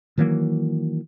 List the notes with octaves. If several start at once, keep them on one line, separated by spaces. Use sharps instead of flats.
D#3 E3 F#3 A#3